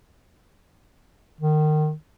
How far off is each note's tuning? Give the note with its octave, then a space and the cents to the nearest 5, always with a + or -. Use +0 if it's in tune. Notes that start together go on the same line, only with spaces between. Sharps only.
D#3 -25